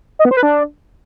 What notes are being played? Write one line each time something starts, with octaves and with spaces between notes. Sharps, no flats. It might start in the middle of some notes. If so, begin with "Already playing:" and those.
D#5
B3
C5
B4
D4